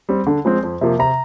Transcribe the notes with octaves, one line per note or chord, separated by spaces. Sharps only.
G3 C4
D3
F3 G#3 C4
F2
C3 F3 A#3
C3 A#5